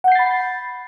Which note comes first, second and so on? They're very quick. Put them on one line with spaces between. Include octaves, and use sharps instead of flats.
F#5 G6 C7 A6 B5